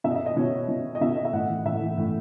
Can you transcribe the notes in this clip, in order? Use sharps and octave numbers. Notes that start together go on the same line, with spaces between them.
B2 E5
D#5
E5
D#5
B2 C#5
B2
D#5
B2 E5
D#5
E5
A2 F#5
E3
A2 E5
E3
A2